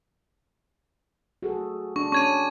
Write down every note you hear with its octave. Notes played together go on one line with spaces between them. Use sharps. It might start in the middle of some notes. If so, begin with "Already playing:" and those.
F#4 G#4 A4
D4 C#6
C#4 C#6 G#6 D#7